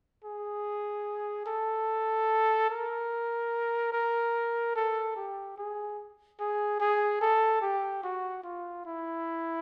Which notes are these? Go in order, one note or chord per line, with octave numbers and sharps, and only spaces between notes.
G#4
A4
A#4
A#4
A4
G4
G#4
G#4
G#4
A4
G4
F#4
F4
E4